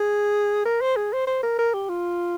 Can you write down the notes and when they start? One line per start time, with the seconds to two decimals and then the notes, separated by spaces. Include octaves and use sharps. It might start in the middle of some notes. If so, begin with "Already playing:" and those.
Already playing: G#4
0.65 A#4
0.81 C5
0.96 G#4
1.13 C5
1.27 C5
1.43 A#4
1.59 A#4
1.74 G4
1.89 F4